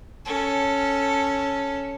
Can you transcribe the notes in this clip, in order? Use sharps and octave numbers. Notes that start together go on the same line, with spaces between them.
C#4 A4